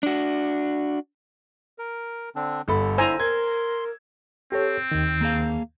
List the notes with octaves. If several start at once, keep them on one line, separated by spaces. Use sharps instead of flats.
D4 F#4
A#4
D3 C4 D4
G1 D3 A4 B5
E4 C5 G#5 A#5 E6
A#4 C6 G#6
C4 G4 A4 C#5
D#2 D#3
A#3 G#4 F5